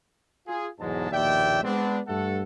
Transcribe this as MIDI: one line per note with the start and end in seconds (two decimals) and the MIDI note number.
0.48 0.68 65
0.48 0.68 68
0.79 1.10 35
0.79 1.10 40
0.79 1.10 44
0.79 1.10 54
0.79 1.10 56
0.79 1.10 81
1.12 1.61 34
1.12 1.61 39
1.12 1.61 47
1.12 1.61 74
1.12 1.61 76
1.12 1.61 79
1.63 2.00 56
1.63 2.00 59
1.63 2.00 60
1.63 2.00 62
2.07 2.43 43
2.07 2.43 57
2.07 2.43 69
2.07 2.43 78